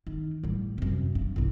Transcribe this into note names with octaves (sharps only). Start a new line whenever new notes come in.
D#3
A1 G3
F#2 C3
G2
B1 E2